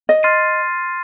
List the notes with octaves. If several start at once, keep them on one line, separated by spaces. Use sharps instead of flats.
D#5
C6 F6 A6 C7 D#7